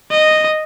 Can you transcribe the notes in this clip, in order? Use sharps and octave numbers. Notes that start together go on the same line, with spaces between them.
D#5